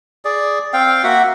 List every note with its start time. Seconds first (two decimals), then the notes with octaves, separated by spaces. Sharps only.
0.25 G#4 D5
0.73 C4 F5 G5
1.04 A#3 F#4 E5 F#5